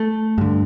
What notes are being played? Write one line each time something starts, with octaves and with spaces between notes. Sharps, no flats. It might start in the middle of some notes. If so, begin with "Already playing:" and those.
Already playing: A3
G2 D3